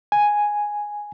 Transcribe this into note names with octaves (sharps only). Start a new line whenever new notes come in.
G#5